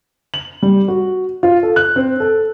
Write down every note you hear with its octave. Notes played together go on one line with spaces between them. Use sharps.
F#7
G3
F#4
F4
A4
F#6
C4
A4